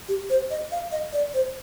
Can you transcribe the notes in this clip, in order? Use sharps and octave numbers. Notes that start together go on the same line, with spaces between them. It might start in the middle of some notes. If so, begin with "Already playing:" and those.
G4
C5
D#5
F5
D#5
D5
C5